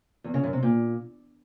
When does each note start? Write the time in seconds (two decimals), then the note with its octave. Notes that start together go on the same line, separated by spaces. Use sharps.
0.24 E2
0.34 C#3
0.43 F#2
0.53 C3
0.63 A#2